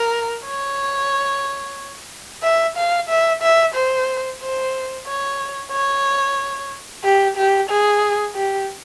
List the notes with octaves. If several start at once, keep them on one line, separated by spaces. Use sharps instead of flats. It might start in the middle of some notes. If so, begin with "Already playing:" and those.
Already playing: A#4
C#5
E5
F5
E5
E5
C5
C5
C#5
C#5
G4
G4
G#4
G4